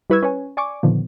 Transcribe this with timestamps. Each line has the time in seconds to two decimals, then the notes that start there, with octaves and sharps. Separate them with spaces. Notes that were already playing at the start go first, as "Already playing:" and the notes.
0.10 G3 E4 B4 C#6 E6 G#6
0.23 C#4 B4 C#5 G#5
0.57 D5 G#5 C#6 D6
0.83 A#2 D3 D#3 F3 B3